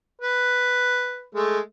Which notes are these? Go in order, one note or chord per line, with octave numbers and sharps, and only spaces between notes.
B4
G#3 A3